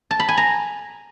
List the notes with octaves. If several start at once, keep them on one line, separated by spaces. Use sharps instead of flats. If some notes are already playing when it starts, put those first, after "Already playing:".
A5
B5
G#5
A#5